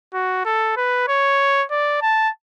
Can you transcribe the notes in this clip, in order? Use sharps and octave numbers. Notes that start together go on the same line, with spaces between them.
F#4
A4
B4
C#5
D5
A5